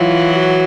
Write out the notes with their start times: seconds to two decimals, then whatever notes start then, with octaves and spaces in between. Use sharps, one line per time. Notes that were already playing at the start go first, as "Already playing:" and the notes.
Already playing: E3 F#3 F4
0.36 F#4